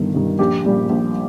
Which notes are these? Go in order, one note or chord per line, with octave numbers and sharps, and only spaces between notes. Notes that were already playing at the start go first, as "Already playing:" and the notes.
Already playing: G1 G2 D#3
G2 D#3
A#1 G4
A#2 G3
A#1